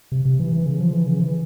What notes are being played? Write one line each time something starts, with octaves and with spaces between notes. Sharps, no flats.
C3
C3
E3
E3
C#3
F3
E3
C#3
E3